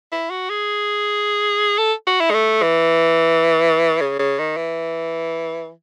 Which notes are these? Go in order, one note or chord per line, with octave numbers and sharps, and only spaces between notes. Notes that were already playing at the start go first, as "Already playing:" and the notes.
E4
F#4
G#4
A4
F#4
E4
G#3
A3
E3
C#3
C#3
D#3
E3